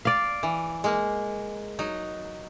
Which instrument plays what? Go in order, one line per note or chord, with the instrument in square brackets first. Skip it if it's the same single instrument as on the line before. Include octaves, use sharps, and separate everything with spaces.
[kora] D5 F5
[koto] E3
G#3 A#3
F#3 D#4